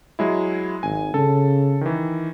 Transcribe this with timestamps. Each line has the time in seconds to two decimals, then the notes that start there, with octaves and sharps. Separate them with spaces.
0.19 F#3 G#3 E4
0.83 G#1 G#5
1.14 C#3 A4
1.81 D#3 E3